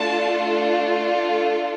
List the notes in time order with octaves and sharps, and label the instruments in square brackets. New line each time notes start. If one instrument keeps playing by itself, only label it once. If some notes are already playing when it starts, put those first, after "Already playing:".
Already playing: [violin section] A3 D4 F4 A4 A5